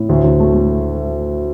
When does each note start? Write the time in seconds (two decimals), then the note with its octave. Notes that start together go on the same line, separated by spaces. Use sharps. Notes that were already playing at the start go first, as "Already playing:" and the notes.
Already playing: A2
0.09 D2
0.24 D2
0.40 A3
0.54 A3